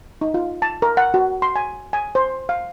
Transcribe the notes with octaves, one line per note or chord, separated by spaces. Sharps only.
D#4
F4
A5
A#4
F#5
F#4
C6
G#5
G#5
C5
F5